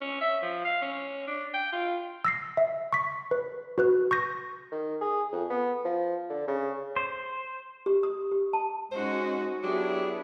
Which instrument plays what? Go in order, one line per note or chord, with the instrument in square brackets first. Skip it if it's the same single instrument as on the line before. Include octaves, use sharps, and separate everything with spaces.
[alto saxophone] C#4
E5
F3
F5
C#4
D4
G5
F4
[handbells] E6 A#6 C7
E5
C#6 B6
B4
F#4 B4 F#6
C#6 G6 A#6
[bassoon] D#3
G#4
F2
B3
F3
D3
C#3
[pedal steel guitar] C5
[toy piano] G4
D#6
G4
A5
[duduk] G#3 [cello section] C#4 D#4 F#4 [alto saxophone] C5
[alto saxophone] F#3 [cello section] B3 E4 [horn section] D4 G#4 [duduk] G4